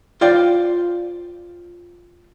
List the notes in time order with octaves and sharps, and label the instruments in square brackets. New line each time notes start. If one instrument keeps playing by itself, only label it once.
[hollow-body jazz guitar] F4 C5 D5 G5